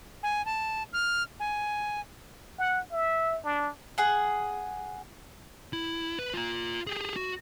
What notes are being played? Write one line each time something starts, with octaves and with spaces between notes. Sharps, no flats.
G#5
A5
F6
G#5
F#5
E5
D4
G#4 F#5
E4
B4
F4 A#5
G4 G#4
F#4